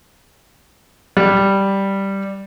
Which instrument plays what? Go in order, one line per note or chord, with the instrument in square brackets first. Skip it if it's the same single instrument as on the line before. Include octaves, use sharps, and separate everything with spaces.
[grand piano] G3